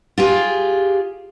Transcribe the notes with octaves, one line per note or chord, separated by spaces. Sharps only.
F4 G4 G#4